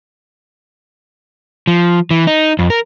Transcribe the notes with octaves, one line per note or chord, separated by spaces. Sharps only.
F3
E3
D#4
F2
A#4